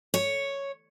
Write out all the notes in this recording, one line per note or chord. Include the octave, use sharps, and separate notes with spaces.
C#5